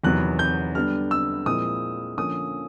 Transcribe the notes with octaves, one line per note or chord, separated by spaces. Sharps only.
E2 C3 D#3 F#3 B3 F#6
G6
D3 G3 B3 D4 F6
E6
A#2 F3 G#3 C4 E4 D#6
D3 F3 A#3 C#4 D#6